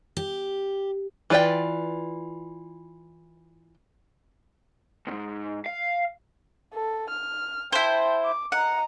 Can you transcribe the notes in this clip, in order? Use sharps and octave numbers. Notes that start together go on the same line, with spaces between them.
G4
E3 F4 B4 D5 G5
C#2 G#2
F5
A4
F6
E4 C5 G5 A5
D6
D#5 F#5 A#5